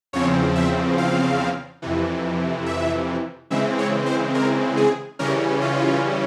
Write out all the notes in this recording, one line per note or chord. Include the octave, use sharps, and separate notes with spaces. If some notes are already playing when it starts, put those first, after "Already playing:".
E2 C#3 F3 C4 C#5
E5
F5
F2 C3 E3
E5
C#3 E3 G#3 C4 E5
C#5
C5
A#4
G#4
C#3 E3 G3 C#4 A#4
F4